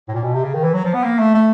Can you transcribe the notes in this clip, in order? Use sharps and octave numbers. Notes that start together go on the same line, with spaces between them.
A2
A#2
B2
C3
C#3
D#3
E3
F#3
F3
B3
A#3
A3
A3